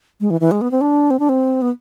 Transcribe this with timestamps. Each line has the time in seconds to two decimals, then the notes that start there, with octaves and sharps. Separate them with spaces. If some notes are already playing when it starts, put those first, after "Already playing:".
0.21 G#3
0.30 E3
0.41 E3
0.51 G#3
0.61 B3
0.71 C4
0.81 D4
1.11 C4
1.19 D4
1.29 C4
1.62 B3